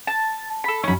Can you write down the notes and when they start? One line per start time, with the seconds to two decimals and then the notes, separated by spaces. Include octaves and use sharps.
0.07 A5
0.64 A4 B5
0.84 F#2 C#4 D#4 B5